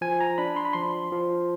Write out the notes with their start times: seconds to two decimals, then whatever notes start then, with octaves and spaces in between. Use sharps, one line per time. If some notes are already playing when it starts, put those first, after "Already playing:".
0.01 F3 G#5
0.21 A#5
0.38 D4 B5
0.56 C6
0.65 B5
0.73 F3 C6
1.12 F3